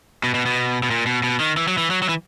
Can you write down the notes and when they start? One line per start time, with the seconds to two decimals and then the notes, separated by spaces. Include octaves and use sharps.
0.24 B2
0.35 B2
0.46 B2
0.83 B2
0.91 A#2
1.06 B2
1.24 B2
1.40 D#3
1.57 E3
1.68 F#3
1.78 E3
1.90 F#3
2.02 F#3
2.09 E3